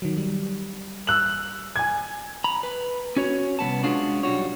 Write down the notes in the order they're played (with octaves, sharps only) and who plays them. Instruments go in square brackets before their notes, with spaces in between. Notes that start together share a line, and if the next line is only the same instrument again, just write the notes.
[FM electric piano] D#3 F#3
G3
[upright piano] E6 F#6 F#7
G#5 G#6
[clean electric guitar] A#5 B5
B4
C#4 F#4 C#5
C2 F#3 B3 A5
G#3 C#4 D4 F4 F#4
B1 G3 F#4 C#5